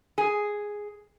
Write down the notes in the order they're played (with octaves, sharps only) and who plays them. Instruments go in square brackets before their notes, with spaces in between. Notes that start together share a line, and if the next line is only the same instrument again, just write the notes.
[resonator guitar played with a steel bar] G#4